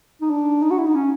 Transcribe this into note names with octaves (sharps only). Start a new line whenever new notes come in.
D#4
D4
D#4
F#4
E4
D#4
C#4